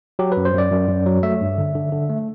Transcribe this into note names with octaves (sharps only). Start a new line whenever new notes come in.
F#3 G4
B4
F#2
C5
F#2 D5
F#2
F#2
F#3
A3 E5
G2
D3
D3
D3
A3